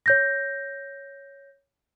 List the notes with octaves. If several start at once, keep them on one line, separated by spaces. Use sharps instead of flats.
C#5 G6 A#6